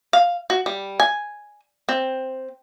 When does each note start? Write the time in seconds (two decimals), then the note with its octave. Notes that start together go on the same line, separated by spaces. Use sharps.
0.13 F5
0.50 F#4
0.66 G3
1.00 G#5
1.89 C4